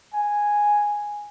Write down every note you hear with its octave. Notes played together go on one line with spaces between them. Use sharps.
G#5